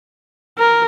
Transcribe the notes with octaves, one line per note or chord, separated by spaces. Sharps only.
A#4